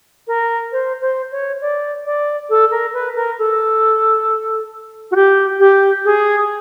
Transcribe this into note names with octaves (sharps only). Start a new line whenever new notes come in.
A#4
C5
C5
C#5
D5
D5
A4
A#4
B4
A#4
A4
F#4
G4
G4
G#4